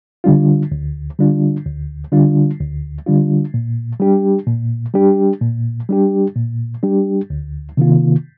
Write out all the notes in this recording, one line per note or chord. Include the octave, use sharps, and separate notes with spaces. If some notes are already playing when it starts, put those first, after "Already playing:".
D3 G3 D4 F4
D2
D3 G3 D4 F4
D2
D3 G3 D4 F4
D2
D3 G3 D4 F4
A#2
G3 D4 G4
A#2
G3 D4 G4
A#2
G3 D4 G4
A#2
G3 D4 G4
D2
C3 D#3 A#3 F4